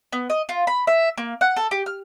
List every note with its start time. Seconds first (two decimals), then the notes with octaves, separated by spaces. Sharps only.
0.13 B3
0.30 D#5
0.49 F4
0.67 B5
0.87 E5
1.18 A#3
1.41 F#5
1.57 A4
1.71 G4
1.86 F6